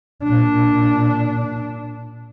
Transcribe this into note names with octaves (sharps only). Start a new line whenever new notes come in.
A#2 D4